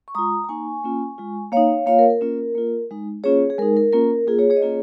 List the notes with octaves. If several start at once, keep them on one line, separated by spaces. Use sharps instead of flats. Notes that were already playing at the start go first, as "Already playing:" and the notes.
C#6
G#3 F4 A#5 D#6
A#5
A#3 D#4 G#5 C#6
A#3 C#4 F4
G#3 F4
A#3 D#4 C#5 F5
A#3 F4 C#5 F5
A#4
A#4
A#3 C#4 F4
A#3 F4
G#3 D#4
A#3 C#4 F4 G#4 C#5
G#4
G#3 D#4 A#4
A#4
A#3 C#4 F4 A#4
A#3 F4 G#4
G#4 C#5
G#4 C#5
D#5
A#3 C#4 F4 G#4 C#5